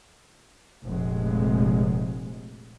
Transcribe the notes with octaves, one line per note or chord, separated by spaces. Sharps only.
F1 A#1 G#3